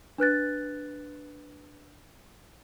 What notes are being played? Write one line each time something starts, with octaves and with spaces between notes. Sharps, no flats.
D4 B4 F#6 A6